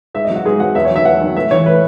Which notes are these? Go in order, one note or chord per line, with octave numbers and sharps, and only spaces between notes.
G#2 E5
D#5
F#3
F#4
G#2 G#4
F#3 F#5
E2 E5
C#5
D#3 F#3 E5
E2 F#5
D#3 F#3
A2 E5
E3 C#5
A2 B4